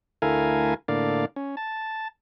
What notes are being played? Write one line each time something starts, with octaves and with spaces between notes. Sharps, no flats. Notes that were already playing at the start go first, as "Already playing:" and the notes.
D2 A3 E4 A#4 F5 G#5
A2 D3 A#3 D5 F5
C#4
A5